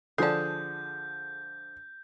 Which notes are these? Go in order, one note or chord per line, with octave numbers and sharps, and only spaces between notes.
D3 F3 G#4 A4 D5 A5 G6